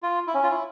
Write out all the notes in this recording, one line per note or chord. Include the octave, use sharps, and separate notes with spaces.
F4
E4
C#4
F4
E4